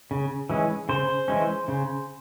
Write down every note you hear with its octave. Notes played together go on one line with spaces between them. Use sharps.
C#3
E3 G#3 C#4
C#3 C5
E3 G#3 C#4
C#3